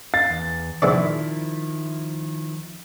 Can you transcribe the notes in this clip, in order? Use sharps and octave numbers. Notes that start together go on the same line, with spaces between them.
F5 A6
E2
A#1 C3 D#3 F3 E4 D5